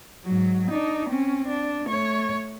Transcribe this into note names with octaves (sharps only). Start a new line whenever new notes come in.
G#2 F#3
D4 D#4
C4 C#4
D4
A3 C#5